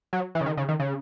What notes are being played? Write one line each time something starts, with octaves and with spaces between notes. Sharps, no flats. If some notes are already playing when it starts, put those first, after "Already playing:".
F#3
E3
C#3
D#3
C#3
D#3
C#3